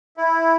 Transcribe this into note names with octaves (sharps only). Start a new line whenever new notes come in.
E4